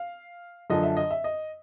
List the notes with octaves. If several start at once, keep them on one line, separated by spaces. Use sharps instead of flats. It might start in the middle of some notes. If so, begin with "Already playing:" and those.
Already playing: F5
F#2 D3 F3 D#5
E5
D#5
E5
D#5